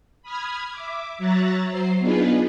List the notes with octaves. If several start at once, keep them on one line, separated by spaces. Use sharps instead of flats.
B5 D#6 F6 G#6
E5 D6
F#3 C#5 E5 A#5 F#6 A6
F#3 C5 C7
B3 D4 D#4 F4 G#4 B4